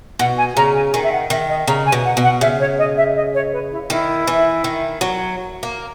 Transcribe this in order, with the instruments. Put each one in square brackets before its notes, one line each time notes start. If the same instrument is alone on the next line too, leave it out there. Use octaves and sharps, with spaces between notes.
[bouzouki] B2 [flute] F#5
[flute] G#5
[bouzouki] C#3 [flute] A#5
[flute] G#5
[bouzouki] D#3 [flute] G#5
[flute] E5
F#5
[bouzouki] D#3 [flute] E5
[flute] D#5
[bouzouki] C#3 [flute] A#5
[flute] G#5
[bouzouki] B2
[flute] F#5
[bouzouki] B2
[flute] F#5
[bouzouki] C#3 [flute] E5
[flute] C#5
D#5
E5
D#5
C#5
B4
E4
[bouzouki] D#3 [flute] E4
[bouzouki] E3
D#3
F#3
A#3